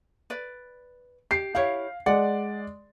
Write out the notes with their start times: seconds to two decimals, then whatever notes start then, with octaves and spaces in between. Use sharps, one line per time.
0.30 B4 D5
1.31 G4 C7
1.55 E4 G4 C#5 F5
2.06 G#3 D5 F#5